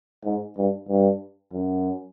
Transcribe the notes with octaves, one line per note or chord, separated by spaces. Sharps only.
G#2
G2
G2
F#2